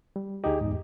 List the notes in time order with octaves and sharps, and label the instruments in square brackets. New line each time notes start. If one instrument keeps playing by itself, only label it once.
[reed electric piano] G3
[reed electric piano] D2 D#4 D#5 [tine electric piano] G4 G#4
[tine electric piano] E2 G#2